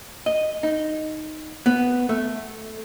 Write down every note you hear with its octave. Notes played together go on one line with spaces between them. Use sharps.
D#5
D#4
B3
A3